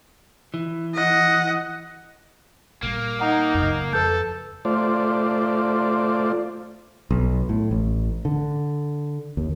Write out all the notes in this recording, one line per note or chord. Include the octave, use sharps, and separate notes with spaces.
E3
D#5 F#5
A#2 G3 A#3
D#4 F#5 A#5
F#2 C#3
F2 A4 B4 G6
A3 F4 C5 D5
B1
A2
A1
D3
D#2